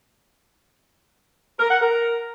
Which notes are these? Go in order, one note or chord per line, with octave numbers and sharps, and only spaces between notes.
A#4
F#5
A#4